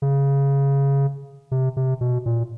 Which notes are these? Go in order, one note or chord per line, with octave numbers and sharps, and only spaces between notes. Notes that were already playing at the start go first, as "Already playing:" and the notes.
C#3
C3
C3
B2
A#2